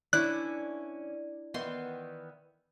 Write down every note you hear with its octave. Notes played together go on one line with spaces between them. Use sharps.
E3 C#4 D4 E4 D5 F#6
D#3 E3 B3 C6